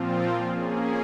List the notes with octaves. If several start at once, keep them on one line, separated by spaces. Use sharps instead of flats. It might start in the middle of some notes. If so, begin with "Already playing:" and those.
Already playing: A#2 F3 C4 F4
A#3 C#4 G#4